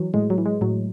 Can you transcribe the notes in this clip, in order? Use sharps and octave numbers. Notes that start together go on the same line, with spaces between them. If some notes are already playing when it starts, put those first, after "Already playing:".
Already playing: E3 F#3
A2 G#3
F#3
E3
G#3
A2 F#3